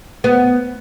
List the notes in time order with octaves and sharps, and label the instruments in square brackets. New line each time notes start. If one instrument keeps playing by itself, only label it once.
[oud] B3